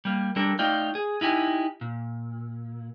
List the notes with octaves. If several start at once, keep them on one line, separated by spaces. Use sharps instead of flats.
G3 A#3
G3 D4 A4 A#4
A3 D#4 F4 D5 G5
G#4
D#4 E4 G4 G#5
A#2